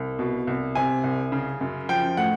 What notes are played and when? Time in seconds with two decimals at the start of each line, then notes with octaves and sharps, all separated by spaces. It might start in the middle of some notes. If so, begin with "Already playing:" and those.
Already playing: C2
0.19 B2
0.47 C2
0.75 C3 G#5
1.04 C2
1.32 C#3
1.61 F#2
1.89 F3 G5
2.17 A2 F#5